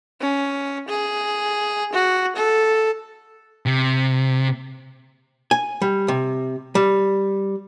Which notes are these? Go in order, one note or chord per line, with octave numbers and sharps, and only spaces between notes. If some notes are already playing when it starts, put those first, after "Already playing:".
C#4
G#4
F#4
A4
C3
G#5
G3
C3
G3